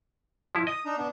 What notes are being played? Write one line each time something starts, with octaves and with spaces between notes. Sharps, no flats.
F3 E4
D#5 D#6
D4 D#4 A#5
B3 D4